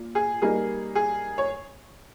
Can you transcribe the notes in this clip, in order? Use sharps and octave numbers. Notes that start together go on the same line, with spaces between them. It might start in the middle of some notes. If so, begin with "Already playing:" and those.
Already playing: A#2
G#4
G3 A#3 D#4 G#4
G#4
C#5